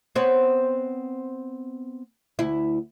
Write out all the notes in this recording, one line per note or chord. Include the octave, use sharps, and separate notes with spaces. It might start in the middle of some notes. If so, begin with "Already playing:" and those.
B3 C4 C#5
D2 E4